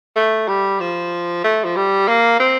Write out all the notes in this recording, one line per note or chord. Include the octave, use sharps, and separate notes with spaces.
A3
G3
F3
A3
F3
G3
A#3
C4